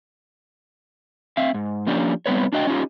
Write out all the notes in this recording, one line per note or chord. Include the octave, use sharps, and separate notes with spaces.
C4 E5 F5
G#2
F3 A#3 C#4 D4 G4
G3 B3 C4 B4 C#5
D4 F#4 D#5 G5
C#4 D#4 F4 G4